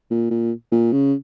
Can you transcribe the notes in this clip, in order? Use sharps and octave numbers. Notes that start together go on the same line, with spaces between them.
A#2
A#2
A#2
C#3